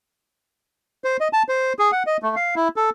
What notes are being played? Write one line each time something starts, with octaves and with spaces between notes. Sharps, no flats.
C5
D#5
A5
C5
G#4
F#5
D#5
A3
F5
E4
A4